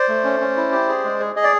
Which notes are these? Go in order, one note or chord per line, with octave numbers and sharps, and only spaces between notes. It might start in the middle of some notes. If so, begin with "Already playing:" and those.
Already playing: C5 D5
A3
C#4
C#4
E4
G4
G#4
G#3
G#4
G#4 D#5
D5